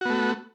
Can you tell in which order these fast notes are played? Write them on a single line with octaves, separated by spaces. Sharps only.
F#4 B3 A3